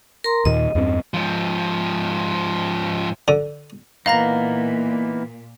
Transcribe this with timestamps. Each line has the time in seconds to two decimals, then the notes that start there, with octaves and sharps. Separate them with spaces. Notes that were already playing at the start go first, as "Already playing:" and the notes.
0.24 A#4 A#5 C6
0.45 D#2 A#2 D#3 D#5
0.75 E2 G2 C4
1.14 G#2 F3
3.28 D3
4.06 A#2 E3 A#3 B3 D#4 F5 A#5 A#6